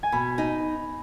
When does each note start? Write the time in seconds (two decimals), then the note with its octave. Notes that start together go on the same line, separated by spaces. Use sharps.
0.03 G#5
0.12 B2 B5
0.38 D#4